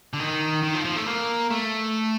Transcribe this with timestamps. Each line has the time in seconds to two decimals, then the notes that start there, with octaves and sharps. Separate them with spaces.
0.13 D3
0.19 D#3
0.63 D#3
0.74 F3
0.85 F3
0.96 A3
1.06 A#3
1.50 A3